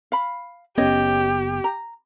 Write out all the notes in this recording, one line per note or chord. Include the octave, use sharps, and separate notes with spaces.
F5 B5
F#1 B3 C#4 G4 C#5 D#5
A#5